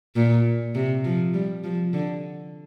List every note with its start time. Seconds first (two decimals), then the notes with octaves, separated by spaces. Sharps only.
0.16 A#2
0.75 C3
1.05 F3
1.34 G3
1.64 F3
1.93 D3